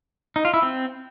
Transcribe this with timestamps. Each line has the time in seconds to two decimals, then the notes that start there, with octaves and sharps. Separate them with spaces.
0.36 D#4
0.45 F4
0.54 E4
0.62 C4